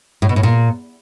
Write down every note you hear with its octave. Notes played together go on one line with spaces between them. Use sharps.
A2
B2
A2
A#2